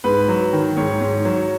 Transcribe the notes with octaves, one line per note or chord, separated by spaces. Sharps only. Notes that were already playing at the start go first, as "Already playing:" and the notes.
G#2 B4
F#3
D#3
G#2 C#5
G#2
F#3